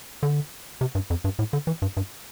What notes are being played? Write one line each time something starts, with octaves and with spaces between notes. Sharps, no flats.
D3
C3
G2
F2
G2
A2
D3
E3
G2
G2